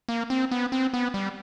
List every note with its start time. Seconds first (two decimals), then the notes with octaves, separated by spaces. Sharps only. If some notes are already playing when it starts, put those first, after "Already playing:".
0.09 A#3
0.30 C4
0.52 B3
0.72 C4
0.94 B3
1.14 G3